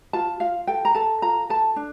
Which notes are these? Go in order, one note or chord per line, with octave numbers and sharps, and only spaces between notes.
F4 A5
F4 F5
A4 G5
A#5
A4 A5
F4 A#5
A4 A5
D4